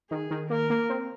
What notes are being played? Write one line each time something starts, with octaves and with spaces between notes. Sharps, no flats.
D#3 G#4
D#3
A#3 A#4
A#3
C4